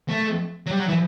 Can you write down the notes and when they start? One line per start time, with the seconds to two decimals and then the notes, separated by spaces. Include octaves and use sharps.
0.09 A3
0.66 F#3
0.71 G3
0.79 F#3
0.88 E3